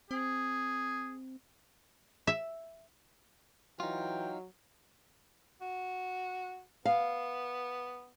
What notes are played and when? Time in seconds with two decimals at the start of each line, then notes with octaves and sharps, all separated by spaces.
0.11 C4 G#4
2.27 E5
3.80 E3 F#3 D#4 F4 G5
5.61 F#4
6.85 B3 F5